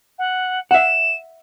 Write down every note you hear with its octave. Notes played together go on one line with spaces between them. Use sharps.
F#5
E5 F#5 E7